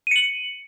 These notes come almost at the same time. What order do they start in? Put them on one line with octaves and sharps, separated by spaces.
D#7 C#7 F#7